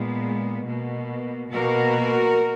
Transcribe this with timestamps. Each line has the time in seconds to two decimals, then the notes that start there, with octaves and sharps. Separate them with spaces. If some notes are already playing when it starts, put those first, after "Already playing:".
Already playing: A#2 G#3 B3
0.65 B2 A#3
1.52 B2 A#3 F#4 A#4